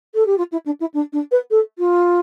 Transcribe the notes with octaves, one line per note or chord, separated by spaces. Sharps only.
A4
G4
F4
E4
D4
E4
D4
D4
B4
A4
F4